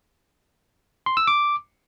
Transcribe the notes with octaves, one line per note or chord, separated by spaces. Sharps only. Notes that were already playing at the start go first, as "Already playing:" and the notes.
C6
E6
D6